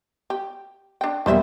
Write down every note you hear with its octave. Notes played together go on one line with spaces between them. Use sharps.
G4
D4 G5
E1 G3 A#3 B3 C5 E5